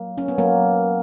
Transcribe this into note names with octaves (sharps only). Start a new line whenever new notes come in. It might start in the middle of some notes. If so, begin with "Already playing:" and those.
Already playing: F#3 A#3
C#4
B3
F#3 A#3